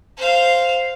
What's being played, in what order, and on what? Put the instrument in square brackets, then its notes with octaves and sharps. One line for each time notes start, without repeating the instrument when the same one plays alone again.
[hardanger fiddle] C5 F5